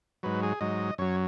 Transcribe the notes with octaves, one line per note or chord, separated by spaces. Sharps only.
G#2 F#3 B4
G#4
G#2 F#3 D#5
F#2 F#3 C#5